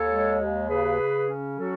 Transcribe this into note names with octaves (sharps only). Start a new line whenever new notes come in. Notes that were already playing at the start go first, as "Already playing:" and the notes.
Already playing: D#2 A4 C#5
G#3
D#2
C#3 G#4 B4
C#3
C#4
F#3 F#4 A4